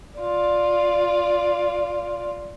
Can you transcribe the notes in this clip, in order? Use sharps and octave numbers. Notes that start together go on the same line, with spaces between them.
F4 D5